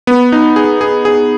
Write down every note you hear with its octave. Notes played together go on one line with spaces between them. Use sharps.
B3
D#4
G#4
G#4
G#4